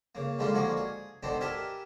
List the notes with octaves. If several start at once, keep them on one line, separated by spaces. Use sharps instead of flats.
C#3 A#3
D3 G3 G#3 D4 D#4 F4
D3 F3 A#3 F#4 G#4 A#4
G#4
B2 D3 B3 C4 D4 D#4
G4 A#4 B4 E5 G#5 A5